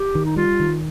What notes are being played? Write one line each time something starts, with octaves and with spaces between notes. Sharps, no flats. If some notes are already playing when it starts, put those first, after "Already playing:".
Already playing: G4
D#3
D#4
G3 F4
D#3